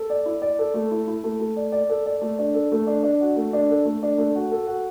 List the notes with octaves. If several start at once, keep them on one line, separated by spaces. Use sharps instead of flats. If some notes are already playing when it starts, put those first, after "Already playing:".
Already playing: A4
D5
E4
D5
A4
A3
E4
E4
A3
A3
D5
D5
A4
D5
A3
D4
A4
A3
D4
D4
F#4
A3
D4
A4
A3
D4
A3
F#4
A4
F#4